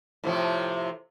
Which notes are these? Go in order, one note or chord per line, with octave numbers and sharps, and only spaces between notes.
A2 C3 F3